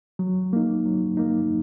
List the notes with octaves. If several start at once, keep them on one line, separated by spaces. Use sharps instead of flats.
F#3
A#3 D#4
F#3
A#3 D#4